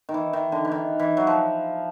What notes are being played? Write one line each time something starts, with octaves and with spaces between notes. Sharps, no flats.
D#3
E3
D#3
D3
E3
D#3
E3
F#3
F3